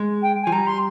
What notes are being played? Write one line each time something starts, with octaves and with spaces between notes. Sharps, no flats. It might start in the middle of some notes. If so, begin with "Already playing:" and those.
Already playing: G#3
G5
F3 G#5
G3 A#5
C6